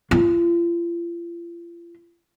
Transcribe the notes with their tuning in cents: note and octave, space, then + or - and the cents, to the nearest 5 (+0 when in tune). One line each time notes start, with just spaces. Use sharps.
F4 -40